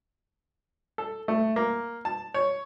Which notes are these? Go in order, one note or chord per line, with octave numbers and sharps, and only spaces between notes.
A4
A3
A#3
A5
C#5